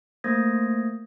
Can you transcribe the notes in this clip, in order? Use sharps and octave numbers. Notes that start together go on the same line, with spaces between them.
A3 A#3 C5 D#6 G#6 A#6